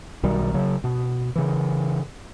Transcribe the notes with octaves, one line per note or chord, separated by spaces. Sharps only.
B1 B2 D#3 G3
C#3 F#3
B2
C#3 E3